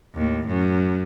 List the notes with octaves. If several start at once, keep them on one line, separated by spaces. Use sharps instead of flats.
D#2 A2
F#2